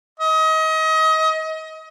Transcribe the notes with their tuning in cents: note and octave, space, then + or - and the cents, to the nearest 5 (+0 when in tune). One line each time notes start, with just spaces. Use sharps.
D#5 +30